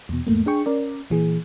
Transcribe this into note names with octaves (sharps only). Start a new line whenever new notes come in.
E2 B2
E2 G#2 A3 A#3
D4 G#4 G5 C#6
C#4 A#4 D5
A#2 E3 G#4